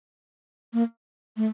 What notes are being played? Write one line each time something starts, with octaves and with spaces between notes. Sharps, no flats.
A#3
A3